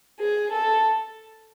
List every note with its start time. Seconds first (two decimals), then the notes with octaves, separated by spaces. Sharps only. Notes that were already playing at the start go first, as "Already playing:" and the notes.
0.21 G#4
0.53 A4